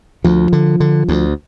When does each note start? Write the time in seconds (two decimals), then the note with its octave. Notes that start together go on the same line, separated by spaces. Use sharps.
0.24 D2 F3
0.53 D3
0.80 D3
1.08 D2